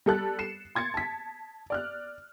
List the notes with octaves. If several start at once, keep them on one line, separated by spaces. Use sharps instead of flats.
G3 A4 F#6 A6
C7 C#7 E7
C6 G#6 A6 C#7
A5 B6
D5 F6 F#6